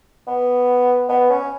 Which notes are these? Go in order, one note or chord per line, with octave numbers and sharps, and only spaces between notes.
B3
B3
C#4